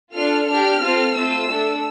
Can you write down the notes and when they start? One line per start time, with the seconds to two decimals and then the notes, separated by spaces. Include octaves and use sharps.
0.14 D4 F4 A4 F6
0.47 D4 G4 F6
0.81 C4 F4 A4
1.14 A3 C4 F4 E6
1.48 A3 D4 A4